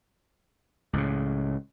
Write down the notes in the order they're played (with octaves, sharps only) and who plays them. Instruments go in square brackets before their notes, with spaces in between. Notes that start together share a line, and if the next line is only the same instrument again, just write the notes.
[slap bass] C#2 A2 C#3